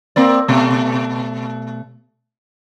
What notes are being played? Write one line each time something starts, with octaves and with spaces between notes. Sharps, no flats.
A#3 C4 D5
B2 A3